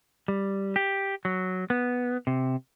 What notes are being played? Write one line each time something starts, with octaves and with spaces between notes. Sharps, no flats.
G3
G4
F#3
B3
C3